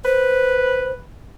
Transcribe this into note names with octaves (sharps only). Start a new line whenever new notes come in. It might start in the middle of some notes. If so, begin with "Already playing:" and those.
B4 C5